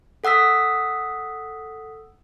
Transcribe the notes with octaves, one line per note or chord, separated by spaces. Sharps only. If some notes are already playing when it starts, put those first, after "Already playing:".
A4 F#5 D#6 E6 B6